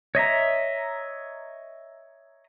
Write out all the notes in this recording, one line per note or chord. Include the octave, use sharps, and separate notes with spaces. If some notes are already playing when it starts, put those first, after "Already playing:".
C#5 D#5 E5 A#5